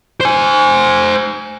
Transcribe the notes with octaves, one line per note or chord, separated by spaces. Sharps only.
C5 G#5